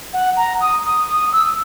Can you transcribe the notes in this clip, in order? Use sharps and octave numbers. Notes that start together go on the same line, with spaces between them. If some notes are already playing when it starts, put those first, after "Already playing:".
F#5
A#5
D#6
D#6
D#6
E6